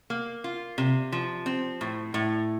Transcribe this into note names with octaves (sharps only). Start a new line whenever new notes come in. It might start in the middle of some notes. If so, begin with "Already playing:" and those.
A#3
F4
C3
F3
C4
A2
A2